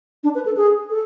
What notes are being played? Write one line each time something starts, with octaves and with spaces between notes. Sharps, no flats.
D4
B4
A4
G#4
A4